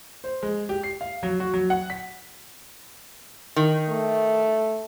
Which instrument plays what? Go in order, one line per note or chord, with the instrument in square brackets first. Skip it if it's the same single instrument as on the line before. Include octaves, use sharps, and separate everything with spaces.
[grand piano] C5
G#3
G4
C7
F5
F#3
F#4
F#3
F#5
B6
[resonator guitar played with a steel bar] D#3
[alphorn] A3